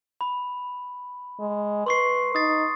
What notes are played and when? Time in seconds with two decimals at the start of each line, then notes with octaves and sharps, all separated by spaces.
0.21 B5
1.40 G#3
1.86 B4 C6 C#6 C7
2.35 D#4 D#6 A6 C7